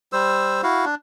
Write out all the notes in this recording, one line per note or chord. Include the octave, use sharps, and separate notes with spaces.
G3 C5 E6
E4 F#4 F5
D4